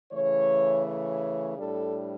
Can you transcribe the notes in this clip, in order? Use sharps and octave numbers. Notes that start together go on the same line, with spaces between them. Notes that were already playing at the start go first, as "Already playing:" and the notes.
C#3 E3 A3 C#5
C#5
A2 G3 D4 A4